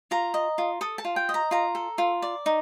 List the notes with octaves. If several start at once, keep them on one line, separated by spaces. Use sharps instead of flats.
F4 A#5
D#5
F4
A4 D#6
A5
F4
G5
D#5
A#5
F4 A#5
A4
F4
D5
D#4